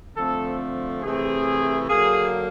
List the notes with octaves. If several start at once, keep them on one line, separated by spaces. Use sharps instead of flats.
D3 F3 A3 C4 A4
C3 E3 A3 C4 G#4
D3 F#3 A#3 G#4